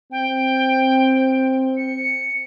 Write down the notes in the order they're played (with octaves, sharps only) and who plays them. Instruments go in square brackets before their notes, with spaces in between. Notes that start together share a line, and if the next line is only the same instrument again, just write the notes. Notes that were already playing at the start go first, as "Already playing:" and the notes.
[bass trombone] C4 [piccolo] G5
[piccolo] C#7